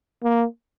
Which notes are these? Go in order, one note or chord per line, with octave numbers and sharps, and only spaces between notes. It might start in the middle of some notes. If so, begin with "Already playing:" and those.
A#3